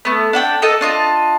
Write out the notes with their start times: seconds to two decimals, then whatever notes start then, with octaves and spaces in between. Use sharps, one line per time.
0.05 A3 B3
0.33 D4 F#5 G5
0.62 A4 A#4 D#5 A5
0.81 D4 F4 D#5